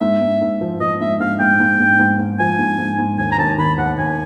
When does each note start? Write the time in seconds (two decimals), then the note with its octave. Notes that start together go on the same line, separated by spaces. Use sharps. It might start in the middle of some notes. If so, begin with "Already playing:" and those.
0.01 G#2 E5
0.22 G#2
0.41 G#2
0.61 F3
0.80 F3 D#5
1.01 G#2 E5
1.20 G#2 F5
1.40 G#2 G5
1.60 G#2
1.80 G#2
1.99 G#2
2.19 G#2
2.39 F3 G#5
2.59 G#2
2.78 G#2
2.99 G#2
3.18 D#2 G#5
3.32 A#5
3.38 D#2 A5
3.58 D#3 B5
3.78 D#2 F#5
3.98 D#2 G#5